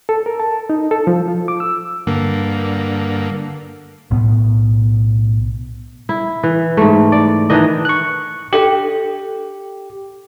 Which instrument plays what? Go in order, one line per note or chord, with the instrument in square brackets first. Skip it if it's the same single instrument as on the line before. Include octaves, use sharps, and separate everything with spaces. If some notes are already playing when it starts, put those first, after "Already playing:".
[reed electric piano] A4
A#4
A5
D#4
A4
F3
F4
D6
E6
[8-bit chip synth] G2 D3 A#3
[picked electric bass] B1 A2 B3
[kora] E4
E3
G#2 A3
D5
D#3 E3 D4 D#5
[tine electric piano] C#6 F#6
[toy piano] D4 A4 G5 [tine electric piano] G4